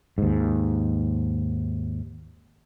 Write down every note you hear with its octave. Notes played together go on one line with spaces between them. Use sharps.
D#2 G#2